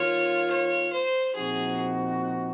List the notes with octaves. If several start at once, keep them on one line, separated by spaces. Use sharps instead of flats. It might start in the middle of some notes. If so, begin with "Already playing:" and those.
Already playing: D#3 A#3 F4 C#5
C#5
C5
A#2 F3 C4 D#4 F#4 G#4